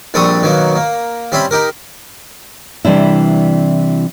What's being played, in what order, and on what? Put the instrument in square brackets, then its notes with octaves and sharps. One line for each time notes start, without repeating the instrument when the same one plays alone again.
[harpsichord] A#1 G3 C4 A4 C#6 D#6
B2 D#3 F#3 A#3
A#3
G3 C4 C#4 E5 B5
D#4 G4 A#4
[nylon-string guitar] C3 E3 G3 D4 E4